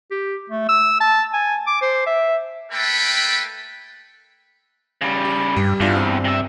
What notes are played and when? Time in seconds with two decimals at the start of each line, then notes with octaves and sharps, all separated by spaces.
0.11 G4
0.50 A3
0.69 E6
1.00 A5
1.33 G#5
1.67 D6
1.82 C5
2.07 E5
2.72 A3 A#3 A4 B4 G5 B5
5.01 C#3 G3
5.25 G4
5.56 G2 G3
5.80 E2 G2 D4 F4 G4
5.96 C4
6.25 C3 E5